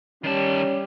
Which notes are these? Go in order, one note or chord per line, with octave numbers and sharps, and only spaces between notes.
D#3 G3 C#4 A5